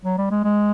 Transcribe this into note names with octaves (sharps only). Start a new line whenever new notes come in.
F#3
G3
G#3
G#3